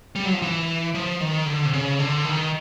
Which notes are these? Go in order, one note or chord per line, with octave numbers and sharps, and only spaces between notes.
G3
F#3
F3
E3
F3
D#3
D3
C3
C#3
D3
D#3